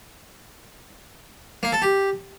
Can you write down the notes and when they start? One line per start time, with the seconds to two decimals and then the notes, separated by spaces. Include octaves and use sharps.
1.63 A#3
1.72 A4
1.82 G4